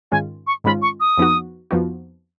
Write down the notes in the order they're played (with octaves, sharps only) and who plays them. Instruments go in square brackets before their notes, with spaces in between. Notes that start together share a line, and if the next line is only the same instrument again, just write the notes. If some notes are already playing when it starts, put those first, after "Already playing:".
[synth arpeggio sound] G#2 D#3 G#3 C#4 F4 [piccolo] G#5
[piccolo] C#6
[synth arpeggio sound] G#2 D#3 G#3 C#4 F4 [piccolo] B5
[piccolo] C#6
D#6
[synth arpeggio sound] F2 F3 B3 D#4 F#4
F2 F3 B3 D#4 F#4